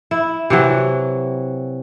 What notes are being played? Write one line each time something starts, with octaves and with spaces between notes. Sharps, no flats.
E4
C3 E3 F#3